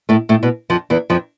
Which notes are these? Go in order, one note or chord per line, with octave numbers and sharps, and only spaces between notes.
A2 A3
A2 A3
B2 B3
F2 F3
E2 E3
F2 F3